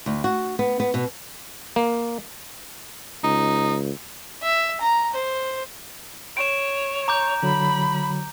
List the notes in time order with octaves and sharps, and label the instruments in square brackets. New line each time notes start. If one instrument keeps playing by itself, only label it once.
[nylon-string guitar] D2
F#4
B3
B3
B2
[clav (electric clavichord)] A#3
[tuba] C#2 [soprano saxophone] D#4
[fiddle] E5
A#5
C5
[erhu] C#5 [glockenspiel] D7 E7
[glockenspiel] A#5 D6 G6
[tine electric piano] D3 F#3 [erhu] B5